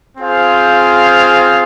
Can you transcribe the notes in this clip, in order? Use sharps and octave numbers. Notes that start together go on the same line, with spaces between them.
C4 F4 G#4 C5 F5